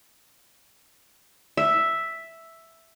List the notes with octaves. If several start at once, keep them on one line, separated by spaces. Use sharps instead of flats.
E5